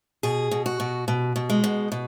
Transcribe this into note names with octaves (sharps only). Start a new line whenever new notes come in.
B2 G#4
B2
F#4
B2
B2
B2
G#3
B2
B2